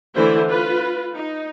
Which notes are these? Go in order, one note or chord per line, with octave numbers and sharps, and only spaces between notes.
D3 E3 A3 E4 C5
F4 B4
D#4